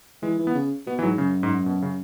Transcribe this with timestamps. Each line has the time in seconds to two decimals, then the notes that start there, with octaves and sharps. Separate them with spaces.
0.23 E3 G#3
0.39 E3
0.47 B3
0.55 C#3
0.86 B2 B3
0.99 E3
1.03 G#2 F#3
1.18 F#2 C#3
1.43 G#2
1.66 B2
1.82 C#3